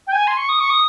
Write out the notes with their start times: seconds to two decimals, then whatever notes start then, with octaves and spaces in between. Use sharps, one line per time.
0.07 G5
0.12 G#5
0.27 C6
0.37 C#6
0.49 D#6
0.60 C#6
0.70 D#6